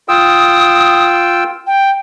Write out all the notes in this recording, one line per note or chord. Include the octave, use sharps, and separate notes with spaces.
F4 G5 D#6 E6
G5